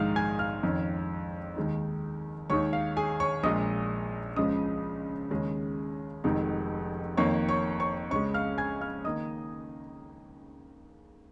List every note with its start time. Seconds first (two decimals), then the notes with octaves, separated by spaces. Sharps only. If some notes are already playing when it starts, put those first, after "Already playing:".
Already playing: A#1 G#2 D#3 G#3 D#4 F5 F6
0.16 G#5 G#6
0.39 F5 F6
0.63 F2 D#3 C#4
1.56 D#2 D#3 G#3 D#4
2.50 D#2 D#3 G#3 D#4 C#5 C#6
2.73 F5
2.97 G#4 G#5
3.20 C#5 C#6
3.43 A#1 A#2 G#3 D#5 D#6
4.36 C#2 C#3 F3 G#3 D#5 D#6
5.30 D#2 C#3 G#3 C#4
6.24 F1 F2 D#3 G#3 D#4
7.17 F2 D#3 A#3 C#5 C#6
7.49 C#5 C#6
7.80 C#5 C#6
8.11 C#2 C#3 G#3 C#5 C#6
8.34 F5 F6
8.58 G#5 G#6
8.81 F5 F6
9.04 D#3 A#3 D#5 D#6